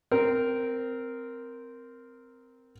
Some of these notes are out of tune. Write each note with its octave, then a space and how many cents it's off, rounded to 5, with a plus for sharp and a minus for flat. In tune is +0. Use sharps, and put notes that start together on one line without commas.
C4 -10 A#4 +0